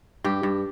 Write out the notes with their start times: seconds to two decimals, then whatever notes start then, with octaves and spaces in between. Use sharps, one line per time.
0.24 G2 G4
0.43 G2